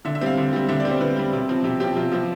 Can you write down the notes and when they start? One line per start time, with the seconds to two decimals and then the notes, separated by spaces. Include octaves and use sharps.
0.05 D3 E5
0.15 E5
0.21 G3 C4 F5
0.37 D3
0.53 G3 C4
0.69 D3 E5
0.80 D5
0.85 G3 C4 C5
1.01 D3 B4
1.16 G3 C4
1.33 C3
1.49 F3 C4
1.64 C3 G4
1.80 F3 C4 G4
1.96 C3 F4
2.12 F3 C4 F4